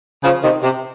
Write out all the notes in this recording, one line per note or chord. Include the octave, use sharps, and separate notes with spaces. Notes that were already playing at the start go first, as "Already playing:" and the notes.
C#3 F3
C3 D#3
C3